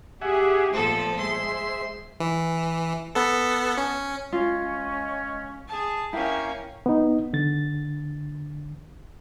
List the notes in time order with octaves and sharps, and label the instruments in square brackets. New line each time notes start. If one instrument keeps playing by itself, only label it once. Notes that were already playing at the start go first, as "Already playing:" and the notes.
[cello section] G4 G#4 [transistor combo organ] E5 F#5 G#5
[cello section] A#2 F3 A3 [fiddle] B3 A4 [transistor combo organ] C5
[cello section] G#3 [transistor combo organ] G#4 C5 E5 [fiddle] C6
[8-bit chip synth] E3
B3 A4
C#4
[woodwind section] G#3 C#4 [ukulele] F4
[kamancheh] G#4 A5
[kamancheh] A#3 C#4 [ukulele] E4 [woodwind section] A#4 G5
[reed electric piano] B3 D#4
D3 A6